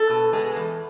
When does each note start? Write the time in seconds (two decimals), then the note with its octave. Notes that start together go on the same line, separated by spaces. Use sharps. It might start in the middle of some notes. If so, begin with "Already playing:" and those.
Already playing: A4
0.10 B2
0.33 G#3 B3
0.56 E2